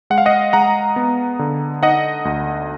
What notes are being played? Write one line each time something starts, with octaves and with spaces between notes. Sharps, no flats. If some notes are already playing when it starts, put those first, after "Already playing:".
G#3 F#5
F5
D#5 F#5
G#3 F#5 A#5
B3
D3
D#4 D#5 F#5
D2